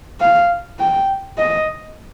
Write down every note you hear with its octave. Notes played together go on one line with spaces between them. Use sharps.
F5
G5
D#5